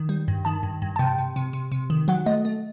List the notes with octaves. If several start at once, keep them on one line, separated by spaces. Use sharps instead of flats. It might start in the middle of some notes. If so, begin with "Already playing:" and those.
Already playing: D#3
G3
G2
D#3 A5
G2
G2
A5
C3 G5
C3
C3
C3
C3
D#3
F#3 F#5
A3 D#5
A3